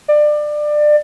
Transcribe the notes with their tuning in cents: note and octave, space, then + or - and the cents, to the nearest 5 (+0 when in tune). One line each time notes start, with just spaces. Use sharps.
D5 +25